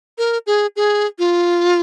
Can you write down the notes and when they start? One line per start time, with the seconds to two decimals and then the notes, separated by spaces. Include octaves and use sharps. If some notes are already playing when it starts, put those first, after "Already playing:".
0.18 A#4
0.47 G#4
0.76 G#4
1.19 F4